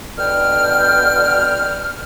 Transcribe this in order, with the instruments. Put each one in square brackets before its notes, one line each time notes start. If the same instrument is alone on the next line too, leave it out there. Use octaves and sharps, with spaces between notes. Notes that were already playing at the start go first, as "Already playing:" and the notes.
[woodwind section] B2 D3 G5 F6